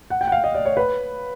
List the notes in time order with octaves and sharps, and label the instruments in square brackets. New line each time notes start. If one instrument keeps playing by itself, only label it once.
[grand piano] F#5
G5
F#5
F5
D#5
D5
C#5
B4